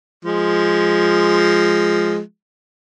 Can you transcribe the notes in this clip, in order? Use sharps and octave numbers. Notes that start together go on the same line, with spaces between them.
F3 G#3